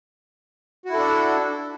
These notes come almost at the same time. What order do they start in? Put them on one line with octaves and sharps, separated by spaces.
F#4 E4 A4 D4